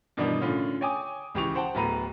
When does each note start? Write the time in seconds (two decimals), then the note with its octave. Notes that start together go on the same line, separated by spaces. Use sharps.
0.17 G2 B2 D#3 E3 D4 D#4
0.41 A2 D3 C#4 F4
0.81 C#5 G5 G#5 D6 D#6
1.35 C#2 E3 G4 C#6 F7
1.55 C5 F#5 G5 A5
1.75 D1 A2 B3 A#5 B5 D#7